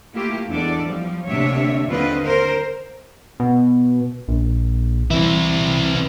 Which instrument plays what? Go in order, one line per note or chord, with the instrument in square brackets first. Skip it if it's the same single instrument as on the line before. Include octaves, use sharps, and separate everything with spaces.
[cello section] A3 A#3 E4 F4 G4
E2 G#3 D4 A4 D5
F3 G3
D2 C3 A#3 D4 C#5 E5
D#2 D3 C4 F4 B4 D#5
A#4 C5
[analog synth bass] B2
A#1
[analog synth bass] E3 [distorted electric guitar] C4 E4